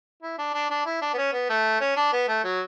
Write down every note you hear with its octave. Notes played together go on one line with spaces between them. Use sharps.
E4
D4
D4
D4
E4
D4
B3
C#4
B3
A3
C#4
D4
B3
A3
F#3